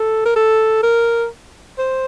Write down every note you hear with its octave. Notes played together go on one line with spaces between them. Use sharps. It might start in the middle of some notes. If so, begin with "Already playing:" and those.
Already playing: A4
A#4
A4
A#4
C5